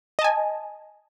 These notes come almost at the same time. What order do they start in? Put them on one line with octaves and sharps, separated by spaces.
D#5 A5 G#5